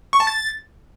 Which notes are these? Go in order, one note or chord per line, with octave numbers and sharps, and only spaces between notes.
C#6
A5
A6